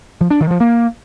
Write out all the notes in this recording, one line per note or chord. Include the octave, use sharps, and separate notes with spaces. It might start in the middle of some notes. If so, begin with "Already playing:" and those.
F3
D4
D#3
F3
A#3